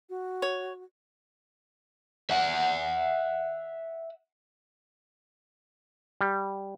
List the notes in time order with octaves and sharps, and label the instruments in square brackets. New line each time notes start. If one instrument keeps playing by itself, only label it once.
[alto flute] F#4
[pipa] C#5
[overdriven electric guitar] E5 F#5
[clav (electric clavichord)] G3